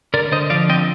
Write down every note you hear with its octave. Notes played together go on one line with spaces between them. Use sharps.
D3 A#4 D5
D3 C5 D#5
F3 D5 F5
C4 D#5 G5